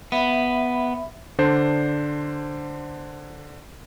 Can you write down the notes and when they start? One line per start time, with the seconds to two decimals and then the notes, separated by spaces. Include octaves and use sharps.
0.12 B3 E5 B5
1.38 D3 D4 C5